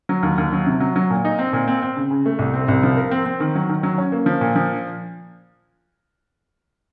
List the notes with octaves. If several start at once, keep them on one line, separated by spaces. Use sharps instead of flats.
F#3
D#2
D#2
F#3
C3
F#3
F#3
A#2
D#4
C4
A#2
C4
C4
C#3
C#3
A3
C2
C4
C2
F3
A#4
C4
C4
D#3
F#3
D#3
F#3
C#4
A#3
F3
A#2
F3